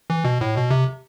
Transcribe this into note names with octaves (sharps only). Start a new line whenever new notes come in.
E3
B2
A2
B2
C3